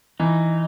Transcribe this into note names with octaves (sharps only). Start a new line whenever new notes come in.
E3 D#4